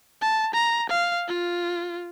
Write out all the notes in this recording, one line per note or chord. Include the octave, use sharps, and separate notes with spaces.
A5
A#5
F5
F4